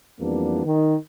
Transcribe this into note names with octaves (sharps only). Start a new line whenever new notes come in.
F2 E3 G3 A#3 B3 D4
D#3